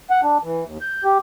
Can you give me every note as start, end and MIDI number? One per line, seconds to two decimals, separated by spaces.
0.10 0.21 78
0.23 0.38 62
0.43 0.64 52
0.65 0.78 39
0.81 1.04 91
1.04 1.18 67